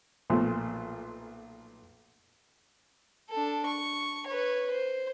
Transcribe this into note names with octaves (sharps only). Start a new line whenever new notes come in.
B1 A#2 F3 A3
D4 A4
C#6
B4 C#5
C5